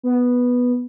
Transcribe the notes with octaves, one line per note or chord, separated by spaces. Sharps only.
B3